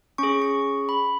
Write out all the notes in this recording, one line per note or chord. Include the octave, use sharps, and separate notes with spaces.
C#4 G#4 C#6
C#6
B5